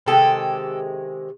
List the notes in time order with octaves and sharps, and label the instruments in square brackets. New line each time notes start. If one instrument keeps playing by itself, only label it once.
[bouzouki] C3 D#3 G#3 G4 A4